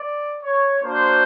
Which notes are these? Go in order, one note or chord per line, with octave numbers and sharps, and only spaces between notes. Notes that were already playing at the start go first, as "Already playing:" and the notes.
Already playing: D5
C#5
A#3 D4 F#4 C5